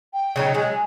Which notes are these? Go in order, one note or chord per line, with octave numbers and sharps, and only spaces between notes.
G5
C#3 F#3 D#4
F#3 G#3 G#5